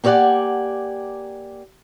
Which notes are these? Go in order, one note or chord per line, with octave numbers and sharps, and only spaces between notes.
A#3 G4 C#5 D5 F#5 G#5